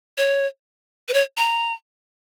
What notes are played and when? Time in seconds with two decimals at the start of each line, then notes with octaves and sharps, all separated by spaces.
0.18 C#5
1.09 B4
1.14 C#5
1.37 A#5